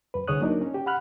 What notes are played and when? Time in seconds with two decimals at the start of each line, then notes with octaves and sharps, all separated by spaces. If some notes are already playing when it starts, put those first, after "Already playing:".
0.14 F#2 B4
0.28 C2 D3 G#4 C#5 D#6 F#6
0.40 F#3 A#3 D4 D#4 A#4
0.61 C#4
0.74 G4
0.86 F#5 B5 F6 F#6